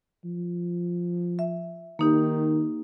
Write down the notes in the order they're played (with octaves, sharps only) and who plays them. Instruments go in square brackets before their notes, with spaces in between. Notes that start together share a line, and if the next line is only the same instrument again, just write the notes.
[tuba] F3
[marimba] E5
[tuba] D#3 [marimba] A#3 D#4 G4